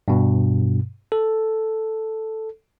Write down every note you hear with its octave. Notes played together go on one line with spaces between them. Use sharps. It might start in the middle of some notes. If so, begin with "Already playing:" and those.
G2 B2
A4